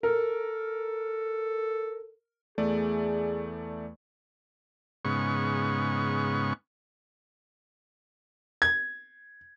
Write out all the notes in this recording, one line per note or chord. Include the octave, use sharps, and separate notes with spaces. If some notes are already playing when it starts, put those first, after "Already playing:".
A4 A#4
E2 A3 G#4 D5
G#2 C#3 B3 C#6
G#6